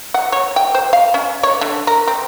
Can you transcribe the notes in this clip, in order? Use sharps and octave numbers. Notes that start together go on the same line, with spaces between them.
F#5
C#5
G5
C5
F5
C#4
C#5
D3
A#4
C4